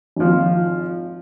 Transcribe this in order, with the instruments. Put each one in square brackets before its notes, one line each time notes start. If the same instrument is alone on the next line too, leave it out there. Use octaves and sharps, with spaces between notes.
[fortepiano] G#1 F3